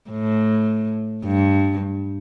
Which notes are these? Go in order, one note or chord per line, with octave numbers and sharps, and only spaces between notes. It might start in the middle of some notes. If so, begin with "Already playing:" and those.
A2
G2